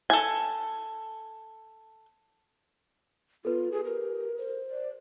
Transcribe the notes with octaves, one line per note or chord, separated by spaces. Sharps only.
A4 G#5
B3 F4 A4 B4
G4 G#4
A#4
C5
D5